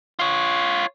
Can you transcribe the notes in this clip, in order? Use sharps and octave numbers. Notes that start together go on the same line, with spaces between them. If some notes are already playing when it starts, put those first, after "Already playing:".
F4 C#5